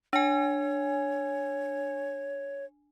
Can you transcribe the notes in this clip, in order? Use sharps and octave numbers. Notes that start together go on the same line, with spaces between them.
D4 C#5 G#5